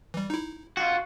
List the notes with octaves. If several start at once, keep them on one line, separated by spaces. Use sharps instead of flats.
E3 G3
D#4 E4
F4 F#4